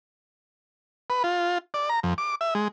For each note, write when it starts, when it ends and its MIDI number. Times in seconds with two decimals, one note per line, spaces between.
1.10 1.23 71
1.24 1.58 65
1.74 1.89 74
1.90 2.00 82
2.03 2.14 41
2.18 2.35 86
2.41 2.54 76
2.55 2.68 56